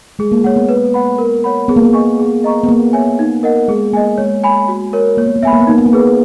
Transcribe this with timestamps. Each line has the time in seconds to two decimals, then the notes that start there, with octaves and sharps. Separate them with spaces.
0.19 G#3 G#4
0.32 A#3
0.44 A#3 C#5 F#5
0.56 B3
0.69 B4
0.94 F#5 B5
1.18 A#4
1.44 C#5 F#5 B5
1.68 B3 G#4
1.76 A#3
1.84 B3
1.93 D#5 G#5 C#6
2.19 G#4
2.44 D#5 A#5 C#6
2.64 B3
2.68 A#3 G#4
2.93 C#5 E5 G#5
3.19 D#4
3.43 A#4 D#5 F#5
3.68 G#3 G#4
3.93 A#3 D#5 G#5
4.18 G#3 C#5
4.44 G#5 B5
4.68 F#4
4.93 A#4 C#5
5.17 A#3 C#5
5.27 B3
5.36 A#3
5.43 B3 E5 G#5 B5
5.52 A#3
5.61 B3
5.67 A#3 D#4
5.78 B3
5.86 A#3
5.93 G#4 B4